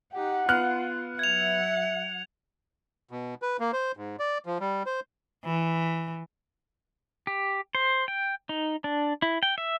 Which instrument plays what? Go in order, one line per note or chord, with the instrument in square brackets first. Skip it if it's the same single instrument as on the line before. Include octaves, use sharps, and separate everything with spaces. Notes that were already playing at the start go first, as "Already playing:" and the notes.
[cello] D#4 G4 [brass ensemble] F#5
[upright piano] B3 F6 F#6 [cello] F4
[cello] F#3 F#5 [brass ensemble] E5 [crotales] G#6 F7
[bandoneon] B2
B4
A#3
C5
G#2
D5
F3
G3
C5
[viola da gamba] E3
[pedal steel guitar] G4
C5
G5
D#4
D4
E4
G5
E5